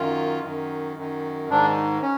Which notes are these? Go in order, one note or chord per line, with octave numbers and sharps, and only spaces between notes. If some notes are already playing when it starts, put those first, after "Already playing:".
Already playing: F#2 D#3 F4
F#2 D#3
F#2 D#3
G#2 D#3 D4
C#4